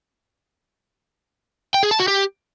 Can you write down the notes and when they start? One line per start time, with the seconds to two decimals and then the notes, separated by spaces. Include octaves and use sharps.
1.74 G5
1.83 G#4
1.91 A5
2.00 F#4
2.08 G4